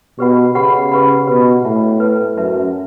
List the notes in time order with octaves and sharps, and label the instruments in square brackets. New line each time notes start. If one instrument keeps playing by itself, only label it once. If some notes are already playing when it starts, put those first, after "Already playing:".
[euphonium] B2 [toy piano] G4 B4 F#5 B5
[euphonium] C#3 [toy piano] G4 B4 F#5 B5
[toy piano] G4 B4 F#5 B5
[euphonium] B2 [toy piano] G4 B4 F#5 B5
[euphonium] A2 [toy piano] B4 E5 A5
[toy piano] B4 E5 A5
[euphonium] F#2 [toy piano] B4 E5 A5